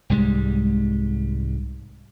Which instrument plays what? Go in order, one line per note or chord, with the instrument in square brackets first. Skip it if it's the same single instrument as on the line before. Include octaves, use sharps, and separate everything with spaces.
[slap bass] C2 G#2 G3 G#3